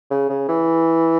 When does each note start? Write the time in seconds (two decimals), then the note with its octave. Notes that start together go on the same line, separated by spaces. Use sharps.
0.11 C#3
0.29 C#3
0.48 E3